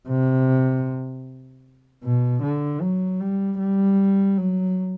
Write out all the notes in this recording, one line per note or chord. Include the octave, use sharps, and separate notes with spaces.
C3
B2
D3
F#3
G3
G3
F#3